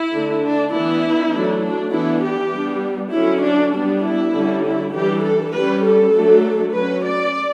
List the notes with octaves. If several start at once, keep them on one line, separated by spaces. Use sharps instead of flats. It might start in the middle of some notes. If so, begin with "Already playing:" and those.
Already playing: E4
D3 A3 D4
D4
E3 B3 D4 E4
F#3 A3 D4
D4
E3 B3 D4 E4
G4
G3 B3 D4
D3 F#3 C#4 E4
D4
G3 B3 D4
E4
D3 G3 C#4
E4
E3 G3 D4 G4
A4
G3 C#4 B4
A4
F#3 A3 D4
F#3 C#4 B4
D5